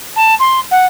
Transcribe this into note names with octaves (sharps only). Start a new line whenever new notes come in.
A5
C6
F#5